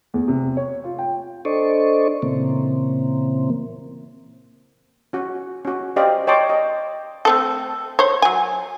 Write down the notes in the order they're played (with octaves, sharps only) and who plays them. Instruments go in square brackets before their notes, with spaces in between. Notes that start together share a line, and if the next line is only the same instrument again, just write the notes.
[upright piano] E2
C3
C#5
F4
G5
[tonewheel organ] D4 A4 C5 D5 D#5 C#6
A#2 C#3 E3 A#3 C4
[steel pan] C#4 F#4
C#4 F#4
C#4 G4 C5 D5 D#5 F5
C#5 D#5 G5 A5 C6 D6
D#5
[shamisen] A3 C4 A4
C5 C#5
F#3 G#5